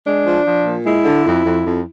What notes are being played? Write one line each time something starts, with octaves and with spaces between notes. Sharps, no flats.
G#3 D4
F3
F3
A#2
G#3 E4
D3
F2
F2
F2